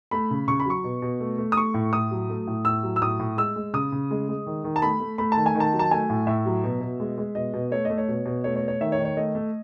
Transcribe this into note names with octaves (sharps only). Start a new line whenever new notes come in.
A3 B5
C#3
C#3 C#6
B5
F#3 C#6
B2
B2
A3
A3
D#6
A3 C#6
A2
A2 D#6
F#3
A3
A2
A2 E6
F#3
E6
A2 D#6
A2
G#3 E6
G#3
C#3 D#6
C#3
G#3
G#3
D#3
D#3
A5
A3 B5
A3
A3 B5
D#3 A5
G#5
D#3
A5
F#3
A5
A3 G#5
A2
A2 E5
F#3
B2
B2
G#3
G#3
B2 D#5
B2
A3 C#5
A3 D#5
C#5
B2
B2
A3 C#5
C#5
A3
C#5
D#3 E5
C#5
D#3
C#5
A3 D#5
A3